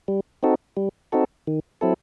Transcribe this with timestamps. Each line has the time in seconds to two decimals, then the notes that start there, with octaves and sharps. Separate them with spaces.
0.08 G3
0.43 C4 D#4 F#4 A4
0.77 G3
1.12 C4 D#4 F#4 A4
1.47 D#3
1.81 F#3 C4 E4 A4